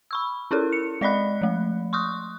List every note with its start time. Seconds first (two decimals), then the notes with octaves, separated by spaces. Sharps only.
0.11 B5 C#6 E6
0.51 C#4 E4 A4 A#4
0.72 C#7
1.01 G#3 D5 D#5 B5 F#6
1.42 F3 A3
1.93 C6 C#6 D#6 F#6